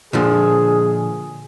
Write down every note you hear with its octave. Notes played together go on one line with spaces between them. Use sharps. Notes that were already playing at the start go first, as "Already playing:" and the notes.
A#2 D3 F3 G#4